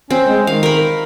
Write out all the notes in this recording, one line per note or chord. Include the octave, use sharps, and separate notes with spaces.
C4 C#4
G#3
D#3 F5
A#4 B5